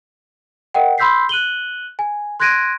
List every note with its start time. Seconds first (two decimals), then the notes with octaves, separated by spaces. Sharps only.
0.74 A#4 D#5 F#5 G5
0.98 B5 C6 E6 G6 B6 C7
1.29 F#6 D#7 F#7 G7
1.99 G#5
2.40 C6 F#6 G#6 A#6 D7 D#7